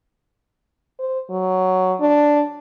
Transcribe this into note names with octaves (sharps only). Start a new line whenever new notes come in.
C5
F#3
D4